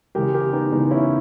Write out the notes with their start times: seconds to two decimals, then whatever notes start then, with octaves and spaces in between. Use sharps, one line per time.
0.15 C#3 E3 G#3 G4 A#4
0.34 G4 A#4
0.53 B3 D#4
0.72 C#3 E3 G#3 B3 D#4
0.91 C#4 E4